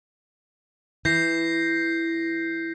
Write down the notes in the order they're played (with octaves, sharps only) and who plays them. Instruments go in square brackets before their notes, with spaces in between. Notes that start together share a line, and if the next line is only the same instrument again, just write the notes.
[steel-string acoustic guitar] E3 [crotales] G6 A#6 C7